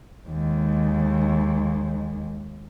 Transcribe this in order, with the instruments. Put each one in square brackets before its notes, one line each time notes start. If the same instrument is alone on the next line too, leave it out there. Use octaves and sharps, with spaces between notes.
[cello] D#2 G#3